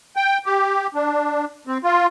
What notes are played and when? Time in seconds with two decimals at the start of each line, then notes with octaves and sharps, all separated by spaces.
0.16 G5
0.46 G4
0.95 D4
1.67 C4
1.84 F4